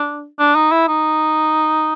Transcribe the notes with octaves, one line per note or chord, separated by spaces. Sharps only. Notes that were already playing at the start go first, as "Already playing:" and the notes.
Already playing: D4
D4
D#4
E4
D#4